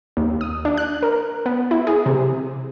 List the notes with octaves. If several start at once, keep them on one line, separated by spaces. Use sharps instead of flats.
D#2
D#6
D4
F#6
A#4
B3
E4
G#4
C3